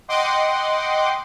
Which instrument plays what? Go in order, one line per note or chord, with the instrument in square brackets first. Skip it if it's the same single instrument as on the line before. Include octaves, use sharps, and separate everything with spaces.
[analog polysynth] D#5 F#5 G5 C6 D6